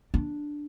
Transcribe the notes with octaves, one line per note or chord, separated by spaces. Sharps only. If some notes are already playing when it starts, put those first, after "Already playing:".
D4